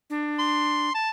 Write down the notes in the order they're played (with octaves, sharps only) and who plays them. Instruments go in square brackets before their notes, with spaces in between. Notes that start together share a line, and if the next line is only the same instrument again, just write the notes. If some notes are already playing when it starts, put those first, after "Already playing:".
[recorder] D4
[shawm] C6
A5